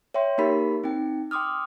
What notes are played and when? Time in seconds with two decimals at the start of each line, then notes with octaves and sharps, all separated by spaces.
0.14 C#5 E5 G5 C6
0.38 A#3 D#4 G4 A#4 B5 B6
0.84 C4 D#4 G5
1.31 G5 C6 D6 D#6 F6